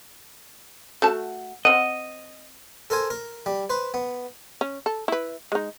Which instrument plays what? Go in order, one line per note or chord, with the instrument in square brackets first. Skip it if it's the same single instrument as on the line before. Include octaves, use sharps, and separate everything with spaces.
[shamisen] A3 F#4 A5
[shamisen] C4 F#5 [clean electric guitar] D#5
[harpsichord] A4 A#4 C5 G#5
A#4
G3
B4 C5
B3
[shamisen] C#4
A4
E4 B4
G#3 D#4